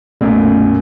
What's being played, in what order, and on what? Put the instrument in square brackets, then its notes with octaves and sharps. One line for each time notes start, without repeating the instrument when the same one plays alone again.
[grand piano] B1 F#2 A#2 [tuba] A3